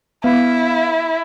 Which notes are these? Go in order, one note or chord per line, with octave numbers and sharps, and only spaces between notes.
B3 E4 F5